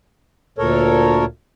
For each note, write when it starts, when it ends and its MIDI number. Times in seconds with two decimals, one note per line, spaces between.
0.58 1.25 38
0.58 1.25 46
0.58 1.25 69
0.58 1.25 70
0.58 1.25 73